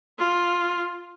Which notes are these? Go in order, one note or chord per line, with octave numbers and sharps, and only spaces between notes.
F4